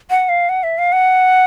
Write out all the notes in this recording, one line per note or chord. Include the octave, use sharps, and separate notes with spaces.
F#5
F5
F#5
E5
F5
F#5